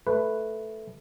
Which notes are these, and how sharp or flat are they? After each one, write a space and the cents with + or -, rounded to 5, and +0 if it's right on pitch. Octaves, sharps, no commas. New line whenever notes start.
A3 +0 B4 +0